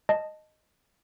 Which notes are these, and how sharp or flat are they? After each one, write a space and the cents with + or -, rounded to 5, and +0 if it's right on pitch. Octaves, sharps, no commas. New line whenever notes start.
D#5 -5 A5 +0